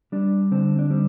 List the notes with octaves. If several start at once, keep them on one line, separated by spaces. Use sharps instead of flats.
G3 D4
D3 C4
D4
G3 C4